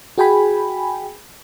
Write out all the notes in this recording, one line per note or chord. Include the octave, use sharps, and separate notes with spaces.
F#4 G#4 G5 G#5 B5